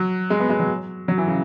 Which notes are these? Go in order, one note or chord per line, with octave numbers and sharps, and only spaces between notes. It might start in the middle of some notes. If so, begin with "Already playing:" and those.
Already playing: F#3
G#3
B3
G#3
F#3
F#3
E3
C#3